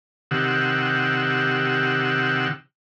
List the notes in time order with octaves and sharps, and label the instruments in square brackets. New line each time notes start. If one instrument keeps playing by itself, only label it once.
[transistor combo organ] C3 D#3 G4 F#5 E6